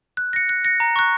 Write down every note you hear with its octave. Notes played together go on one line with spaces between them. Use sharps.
F#6
A#6 C#7
F#6
A#6 C#7
A#5
C#6 F#6